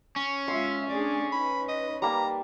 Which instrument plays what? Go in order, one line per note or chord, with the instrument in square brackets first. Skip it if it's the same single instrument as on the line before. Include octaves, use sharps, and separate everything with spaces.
[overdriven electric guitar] C#4
[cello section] G#3 F4 E5 [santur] C6
[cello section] A3 D4 G#4 [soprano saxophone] D5
[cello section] D#4 B4 [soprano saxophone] B5
[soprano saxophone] D#5
[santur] G3 A#3 A5 [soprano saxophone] A#5